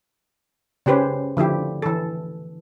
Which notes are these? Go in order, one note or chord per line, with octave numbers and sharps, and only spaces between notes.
C#3 C#4 G4 B4 C5
D3 F3 E4 G4
E3 A4